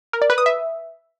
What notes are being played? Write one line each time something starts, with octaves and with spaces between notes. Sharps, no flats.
A#4
D5
B4
D#6
E5